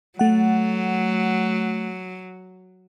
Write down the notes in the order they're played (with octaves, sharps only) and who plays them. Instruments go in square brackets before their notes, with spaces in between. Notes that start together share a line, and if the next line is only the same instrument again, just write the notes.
[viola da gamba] F#3 [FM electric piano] A3 F#5